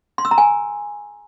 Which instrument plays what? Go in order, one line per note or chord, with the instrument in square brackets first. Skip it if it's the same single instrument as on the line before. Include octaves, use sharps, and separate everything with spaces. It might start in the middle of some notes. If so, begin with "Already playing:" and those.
[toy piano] C6
E6
A#5
G#5